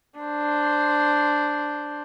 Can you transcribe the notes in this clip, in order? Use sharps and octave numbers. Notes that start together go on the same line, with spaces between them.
D4 C5